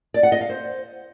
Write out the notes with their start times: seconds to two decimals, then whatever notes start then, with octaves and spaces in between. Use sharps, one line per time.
0.14 D5
0.23 F#5
0.32 D#5
0.41 F5
0.50 C5